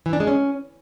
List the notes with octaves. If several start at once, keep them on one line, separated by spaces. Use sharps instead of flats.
E3
D4
G#3
C#4